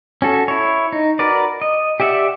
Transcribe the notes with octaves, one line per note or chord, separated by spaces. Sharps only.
C#4 F#4 A4
E4 C#5
D#4
F#4 A#4 B4 D5
D#5
G4 D5 E5 F#5